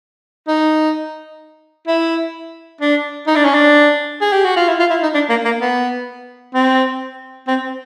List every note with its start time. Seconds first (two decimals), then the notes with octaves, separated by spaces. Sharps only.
0.48 D#4
1.87 E4
2.81 D4
3.27 D#4
3.36 D4
3.45 C#4
3.54 D4
4.21 G#4
4.33 G4
4.44 F#4
4.56 F4
4.68 E4
4.79 F4
4.90 E4
5.03 D#4
5.14 D4
5.30 A#3
5.45 A#3
5.61 B3
6.55 C4
7.48 C4